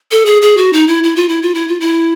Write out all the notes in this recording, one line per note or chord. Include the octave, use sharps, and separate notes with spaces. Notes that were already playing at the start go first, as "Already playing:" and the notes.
A4
G#4
G#4
F#4
D#4
E4
E4
F4
E4
F4
E4
F4
E4